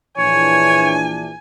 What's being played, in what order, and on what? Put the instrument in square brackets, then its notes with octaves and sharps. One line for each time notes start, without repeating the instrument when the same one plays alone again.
[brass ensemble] A#1 E3 D4 [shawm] C#5 [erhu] G#5